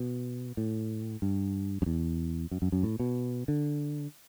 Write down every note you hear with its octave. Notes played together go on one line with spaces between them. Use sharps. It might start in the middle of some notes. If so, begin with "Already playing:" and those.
Already playing: B2
A2
G2
F#2
E2
F#2
F#2
F#2
A2
B2
D3